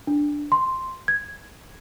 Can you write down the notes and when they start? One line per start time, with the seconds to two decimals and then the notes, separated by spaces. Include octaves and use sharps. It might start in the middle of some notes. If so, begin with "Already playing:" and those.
0.07 D4
0.52 C6
1.08 G#6